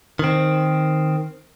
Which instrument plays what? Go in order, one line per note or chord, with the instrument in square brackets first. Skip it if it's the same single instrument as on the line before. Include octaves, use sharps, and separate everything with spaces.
[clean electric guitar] D#3 C4